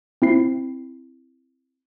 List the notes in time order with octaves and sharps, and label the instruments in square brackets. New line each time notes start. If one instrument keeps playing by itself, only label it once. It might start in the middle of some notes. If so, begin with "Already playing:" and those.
[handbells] C4 E4 C7